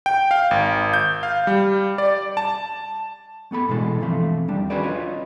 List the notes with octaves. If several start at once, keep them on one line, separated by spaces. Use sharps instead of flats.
G5
F5
G#1
G6
F5
G3
D5
A5
A3 B3 A4 B5
B2 D3 E3 G#3 A4
E3 F3 A3 C4
D#2 G3 D4
C#4 F#4 G#4 B4 C5 D5
F4 B4 C#5 D#5